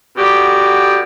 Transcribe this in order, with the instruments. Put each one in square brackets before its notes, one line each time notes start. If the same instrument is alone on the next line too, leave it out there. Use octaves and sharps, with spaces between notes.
[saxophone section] B2 D3 G4